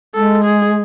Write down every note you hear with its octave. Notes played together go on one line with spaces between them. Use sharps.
G#3 A4
G#4